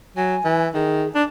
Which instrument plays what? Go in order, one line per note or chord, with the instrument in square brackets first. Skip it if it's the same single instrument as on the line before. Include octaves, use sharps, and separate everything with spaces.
[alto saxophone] F#3 [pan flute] G#5
[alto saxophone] E3
[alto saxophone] D#3 [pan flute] G#4
[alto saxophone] D4 [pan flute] D6